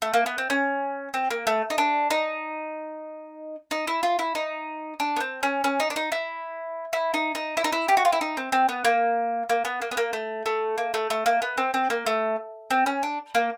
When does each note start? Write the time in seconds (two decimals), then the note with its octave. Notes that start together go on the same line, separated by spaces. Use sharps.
0.02 A3
0.14 A#3
0.26 B3
0.38 C4
0.50 C#4
1.14 C4
1.31 A#3
1.47 A3
1.70 D#4
1.78 D4
2.10 D#4
3.71 D#4
3.87 E4
4.03 F4
4.19 E4
4.35 D#4
5.00 D4
5.17 B3
5.20 C4
5.43 C#4
5.64 C#4
5.80 D#4
5.90 D4
5.96 D#4
6.12 E4
6.93 E4
7.14 D#4
7.35 D#4
7.57 E4
7.64 D#4
7.72 E4
7.88 G4
7.97 F#4
8.05 F4
8.12 E4
8.21 D#4
8.37 C4
8.52 C4
8.69 B3
8.85 A#3
9.49 A#3
9.65 B3
9.82 A#3
9.91 B3
9.97 A#3
10.13 A3
10.46 A3
10.78 A#3
10.94 A3
11.10 A3
11.26 A#3
11.42 B3
11.58 C4
11.74 C4
11.90 A#3
12.06 A3
12.71 C4
12.86 C#4
13.03 D4
13.35 A#3